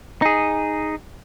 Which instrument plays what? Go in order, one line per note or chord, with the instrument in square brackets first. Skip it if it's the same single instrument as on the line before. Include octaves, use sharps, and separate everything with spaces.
[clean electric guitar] D#4 G#4